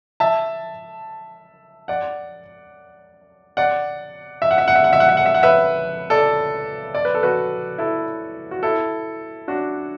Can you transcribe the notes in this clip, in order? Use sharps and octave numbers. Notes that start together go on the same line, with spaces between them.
E5 A5
D5 F#5
D5 F#5
E5
F#5
E5
F#5
E5
F#5
E5
F#5
E5
F#5
E5
F#5
B4 E5
A4 D5
D5
B4
A4
F#4 B4
E4 A4
F#4
E4 A4
D4 F#4